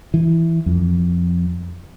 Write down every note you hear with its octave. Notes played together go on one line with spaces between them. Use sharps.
E3
F2